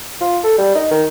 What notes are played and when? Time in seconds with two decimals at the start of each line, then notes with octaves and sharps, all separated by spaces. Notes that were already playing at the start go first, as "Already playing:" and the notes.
0.21 F4
0.44 A4
0.58 G3
0.75 D#4
0.91 D#3